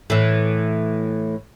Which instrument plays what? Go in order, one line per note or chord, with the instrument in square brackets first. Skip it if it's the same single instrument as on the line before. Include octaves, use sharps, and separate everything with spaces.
[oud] A2 E3